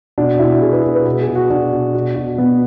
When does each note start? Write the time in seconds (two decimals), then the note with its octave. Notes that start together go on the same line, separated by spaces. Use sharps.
0.18 B2 D4
0.39 B2 E4
0.62 B2 G#4
0.72 B4
0.83 B2
0.95 B4
1.05 B2
1.21 G#4
1.28 B2
1.35 F#4
1.50 B2 D4
1.72 B2
1.94 B2
2.16 B2
2.38 B2 B3